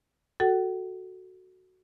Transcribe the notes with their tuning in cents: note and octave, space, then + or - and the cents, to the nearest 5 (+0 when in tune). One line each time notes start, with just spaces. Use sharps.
F#4 +0 A4 +0 F#5 +45